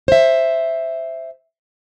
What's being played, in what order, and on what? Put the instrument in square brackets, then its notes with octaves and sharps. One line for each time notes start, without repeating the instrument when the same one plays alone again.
[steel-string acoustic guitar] C5 E5